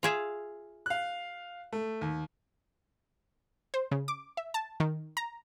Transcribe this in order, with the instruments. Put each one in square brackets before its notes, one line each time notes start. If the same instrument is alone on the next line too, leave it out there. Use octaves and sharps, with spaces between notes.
[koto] F4 G#4 E5
[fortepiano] F5 F#6
A3
D#2
[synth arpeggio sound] C5
C#3
D6
E5
A5
D#3
A#5